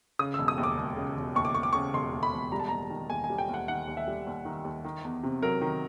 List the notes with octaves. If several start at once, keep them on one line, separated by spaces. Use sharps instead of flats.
C#3 D#6
E6
E1
D#6
D#2
D6
E1
C#3
E1
D#2 C#6
D6
E1 C#6
D6
C#3 C#6
E1 C6
D#2
B5
E1
G3 A#5
A5
D#2 A#5
D#3
D#2 G#5
G#5
G3
G5
D#2 F#5
D#3 F#5
D#2
E5
G3
D#2
D#3
D#2
D#3
E2
C3
F#3 A#4
D#3